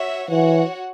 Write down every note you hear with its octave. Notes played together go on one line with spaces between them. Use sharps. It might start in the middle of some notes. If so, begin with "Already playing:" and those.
Already playing: F#4 C#5 E5
E3 F#4 C#5 F#5